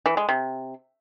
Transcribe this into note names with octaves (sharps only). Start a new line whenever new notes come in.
E3
G#3
C3